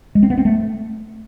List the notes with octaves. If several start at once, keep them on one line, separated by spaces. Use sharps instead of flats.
G#3
C4
B3
C4
A3